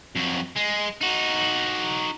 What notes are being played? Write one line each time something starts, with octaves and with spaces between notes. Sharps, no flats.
F2 F#3
G#3
D#4 F#4